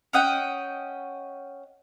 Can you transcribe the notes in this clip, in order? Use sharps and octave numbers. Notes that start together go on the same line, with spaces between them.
C#4 D#5 F#5 G5